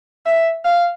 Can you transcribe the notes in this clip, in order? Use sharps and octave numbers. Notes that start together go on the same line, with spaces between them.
E5
F5